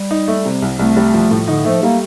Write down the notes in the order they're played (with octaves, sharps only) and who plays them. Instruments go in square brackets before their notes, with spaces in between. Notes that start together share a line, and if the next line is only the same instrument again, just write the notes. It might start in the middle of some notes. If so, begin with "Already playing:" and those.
Already playing: [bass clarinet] G3
[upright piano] D#4
A3
C3
C2
[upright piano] C2 [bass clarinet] A3
[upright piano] G3
F3
A2
[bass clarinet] D3 [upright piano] D#4
[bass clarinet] F3 [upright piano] A3
[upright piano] G3 [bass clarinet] A#3